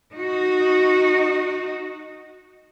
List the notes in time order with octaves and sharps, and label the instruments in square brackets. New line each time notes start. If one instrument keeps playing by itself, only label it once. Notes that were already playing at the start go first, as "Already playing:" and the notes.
[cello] D#4 F#4